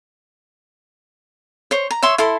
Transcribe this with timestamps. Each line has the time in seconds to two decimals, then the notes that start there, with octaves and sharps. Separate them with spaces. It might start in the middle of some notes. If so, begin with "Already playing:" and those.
1.71 C5 C#5
1.91 A#5
2.03 C#5 E5 C6 C#6
2.18 E4 A4 C6